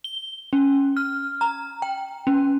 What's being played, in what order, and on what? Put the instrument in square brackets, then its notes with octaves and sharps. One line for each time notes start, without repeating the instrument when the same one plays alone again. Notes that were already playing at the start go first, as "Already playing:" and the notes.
[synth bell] G7
C#4
F6
A#5
G5
C#4